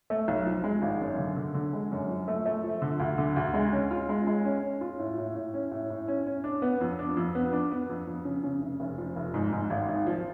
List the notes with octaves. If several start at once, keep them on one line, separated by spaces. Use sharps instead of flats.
A3
B1
F3
G#3
G#1
F#2
D3
D3
D3
G#3
F#2
F3
A3
A3
F3
D3
D2
D3
D2
G#3
C#4
F4
G#3
G#3
C#4
C#4
F4
A2
A2
A2
C#4
A2
A2
C#4
C#4
D4
B3
F2
D4
F2
B3
D4
B3
F2
F2
C#3
C#3
F1
F1
F3
F1
G#2
G#2
G#1
G#1
F3